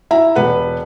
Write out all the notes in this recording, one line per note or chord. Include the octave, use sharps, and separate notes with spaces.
E4 E5 A#5
E1 B4 F#5